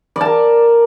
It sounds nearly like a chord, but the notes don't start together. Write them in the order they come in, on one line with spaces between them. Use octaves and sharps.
D5 A5 A#4